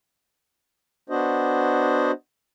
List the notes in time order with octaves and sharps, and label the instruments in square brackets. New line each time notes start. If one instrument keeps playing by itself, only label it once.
[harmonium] B3 D4 F#4 C5 D#5